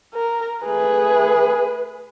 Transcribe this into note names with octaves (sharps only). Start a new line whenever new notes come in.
A#4
A3 G#4 B4